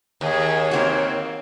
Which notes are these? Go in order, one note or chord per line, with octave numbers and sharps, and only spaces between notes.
D#2 G#4 C#5
D#3 A#3 C4 F#4